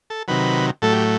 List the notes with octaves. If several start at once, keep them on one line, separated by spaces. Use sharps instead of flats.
A4
C3 D#3 F#3 B4
A2 F#3 A3 A4
G4